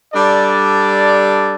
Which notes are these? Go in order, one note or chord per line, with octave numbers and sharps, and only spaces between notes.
G3 D4 A4 D5